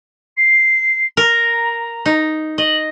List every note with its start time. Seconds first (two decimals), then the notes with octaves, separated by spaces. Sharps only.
0.37 C7
1.17 A#4 A#5
2.06 D#4
2.58 D#5 F#7